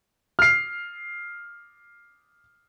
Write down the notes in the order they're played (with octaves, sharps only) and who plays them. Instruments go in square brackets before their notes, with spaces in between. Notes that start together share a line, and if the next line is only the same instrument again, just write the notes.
[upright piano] F6 C7